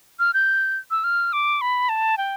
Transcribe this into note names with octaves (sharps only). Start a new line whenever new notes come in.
F6
G6
E6
F6
D6
B5
A5
G5